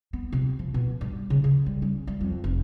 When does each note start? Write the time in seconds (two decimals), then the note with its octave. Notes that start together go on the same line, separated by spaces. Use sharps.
0.13 B3
0.32 C3
0.59 F3
0.74 B2
1.01 G2
1.30 C#3
1.44 C#3
1.66 G3
1.82 C#4
2.07 G3
2.21 F2
2.44 F1